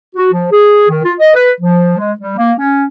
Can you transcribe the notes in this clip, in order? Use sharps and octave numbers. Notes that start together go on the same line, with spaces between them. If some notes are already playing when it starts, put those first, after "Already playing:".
F#4
F3
G#4
D#3
F4
D#5
B4
F3
G#3
G3
A#3
C#4